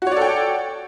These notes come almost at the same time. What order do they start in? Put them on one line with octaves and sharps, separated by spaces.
F#4 C#5 D5 A4 G5